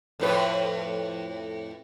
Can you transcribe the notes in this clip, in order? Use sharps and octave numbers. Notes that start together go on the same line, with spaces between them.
F2 A2 B4